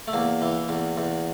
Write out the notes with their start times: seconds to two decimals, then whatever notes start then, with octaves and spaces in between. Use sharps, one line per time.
0.08 A3
0.13 E2 A#3
0.42 E3
0.69 E2
0.97 E2